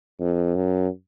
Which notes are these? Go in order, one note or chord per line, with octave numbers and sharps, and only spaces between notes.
F2
F#2